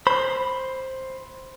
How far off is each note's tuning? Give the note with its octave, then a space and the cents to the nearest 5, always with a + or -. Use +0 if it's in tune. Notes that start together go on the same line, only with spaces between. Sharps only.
C5 +10 B5 +5